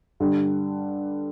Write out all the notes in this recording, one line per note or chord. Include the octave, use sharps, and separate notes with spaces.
G2 D3 G3